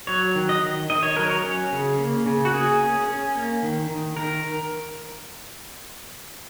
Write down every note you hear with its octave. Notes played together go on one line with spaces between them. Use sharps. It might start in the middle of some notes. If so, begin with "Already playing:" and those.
F#3 C#5
D#3
D#5
D#3
D#3 D#5
C#5
F#3 A#4
C#5
C#4
C#3
A#3
C#3
F#4
A#3 G#4
C#4
C#4
A#3
D#3
D#3
D#3 A#4